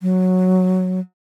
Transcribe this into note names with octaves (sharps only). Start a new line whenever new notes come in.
F#3